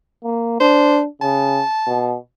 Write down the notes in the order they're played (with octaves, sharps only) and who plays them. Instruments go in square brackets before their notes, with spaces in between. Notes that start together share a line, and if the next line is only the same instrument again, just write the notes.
[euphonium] A#3
[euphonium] D4 [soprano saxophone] C5
[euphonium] C#3 [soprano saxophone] A5
[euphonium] B2